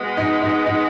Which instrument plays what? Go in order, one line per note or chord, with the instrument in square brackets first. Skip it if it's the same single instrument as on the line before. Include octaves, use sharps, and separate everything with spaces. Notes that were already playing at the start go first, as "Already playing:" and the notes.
Already playing: [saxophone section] B2 G#3 B3
[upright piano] D#4
D#4
D#4